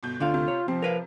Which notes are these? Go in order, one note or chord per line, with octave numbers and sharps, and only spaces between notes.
G1 B2 G6
D2 D3 D4 F4 F5
C3
C#5
C3 F3 C4
A#4 B4 F5